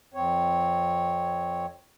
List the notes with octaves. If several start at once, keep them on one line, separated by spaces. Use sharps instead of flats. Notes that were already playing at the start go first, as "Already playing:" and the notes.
F2 C4 C#5